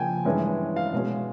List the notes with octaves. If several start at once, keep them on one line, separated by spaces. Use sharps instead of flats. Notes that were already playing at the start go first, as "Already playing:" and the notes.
Already playing: C#3 F3 A#3 G5 G#5
G2 E3 G#3 C#4
F5
B2 G#3 C#4